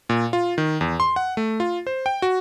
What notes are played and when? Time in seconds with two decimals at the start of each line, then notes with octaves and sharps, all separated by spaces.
0.09 A#2
0.33 F4
0.58 D#3
0.81 E2
1.00 C6
1.16 F#5
1.37 A3
1.60 F4
1.87 C5
2.06 G5
2.22 F#4